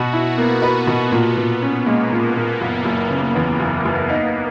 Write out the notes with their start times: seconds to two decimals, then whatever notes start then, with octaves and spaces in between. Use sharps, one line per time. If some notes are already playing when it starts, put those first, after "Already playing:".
Already playing: B2 F#4 B4
0.13 E4
0.37 A#3 B3
0.62 B4
0.87 B2
1.12 A#2
1.37 A#2
1.62 C#4
1.86 G#3 A#3
2.11 A#2
2.36 A#2
2.61 F#1
2.85 F#1
3.10 C#3
3.35 E2
3.60 F#1
3.85 F#1
4.09 D#4